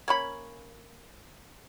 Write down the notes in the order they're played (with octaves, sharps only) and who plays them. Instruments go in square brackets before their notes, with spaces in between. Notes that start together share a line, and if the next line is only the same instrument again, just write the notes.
[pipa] A#3 C#4 B5